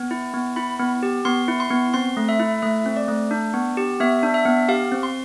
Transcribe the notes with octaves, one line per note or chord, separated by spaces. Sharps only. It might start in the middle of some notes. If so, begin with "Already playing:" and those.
Already playing: B3
E4
B3
E4 B5
B3
G4
B3 C6
E4
C6
B3
C4 C6
A3
E5
E4
A3 E5
C4
D5
A3
D4
B3
G4
B3 E5
D4
E5
B3
G4 F5
C4
C6